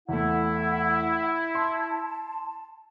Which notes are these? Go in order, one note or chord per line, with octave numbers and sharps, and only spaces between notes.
E2 A3 E4 F#5
A5 C6